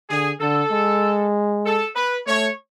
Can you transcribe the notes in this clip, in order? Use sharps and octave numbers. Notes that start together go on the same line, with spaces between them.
D3 G#4
D3 A4
G#3
A4
B4
A3 C#5